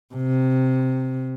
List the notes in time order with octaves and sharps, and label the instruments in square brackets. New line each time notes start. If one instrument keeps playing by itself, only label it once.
[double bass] C3